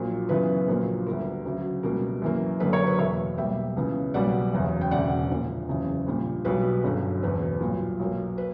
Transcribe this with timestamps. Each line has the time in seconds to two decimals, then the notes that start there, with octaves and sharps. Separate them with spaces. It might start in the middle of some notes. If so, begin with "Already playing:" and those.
Already playing: A#1 A#2 F#3 A#3
0.29 F#2 C#3 E3 B3 B4
0.68 A#1 A#2 F#3 A#3
1.06 D2 D3 G3 B3 A#4
1.45 D2 C#3 F#3
1.83 C#2 B2 G3 A#3 A#4
2.22 F#2 E3 A#3
2.60 F#1 F#2 D3 A#3 B4
2.73 A#4 C#5
2.87 B4
2.99 E2 B2 A#3 C#5 E5
3.37 B1 B2 G3 A#3 E5 G5
3.76 C#2 C#3 E3 B3
4.14 B1 B2 G3 A#3 D5 F#5
4.53 F#1 E2 C#3
4.81 G5
4.91 E1 D2 C#3 D5 F#5
5.30 A#1 A#2 A#3
5.69 F#1 E2 C#3 E3
6.07 A#1 A#2 G3
6.45 B1 B2 G3 B4
6.84 G1 F#2 D3
7.22 F#1 E2 B2 B4
7.60 B1 A#2 G3
7.99 B1 B2 F#3 A#3
8.38 B4